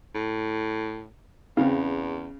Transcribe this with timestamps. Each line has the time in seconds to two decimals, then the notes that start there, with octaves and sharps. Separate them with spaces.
0.15 A2
1.57 E2 C#3 C4 F5